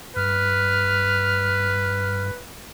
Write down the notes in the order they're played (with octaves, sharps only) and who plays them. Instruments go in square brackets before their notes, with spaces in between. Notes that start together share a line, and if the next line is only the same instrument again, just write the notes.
[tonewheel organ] G2 [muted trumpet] B4 [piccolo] F6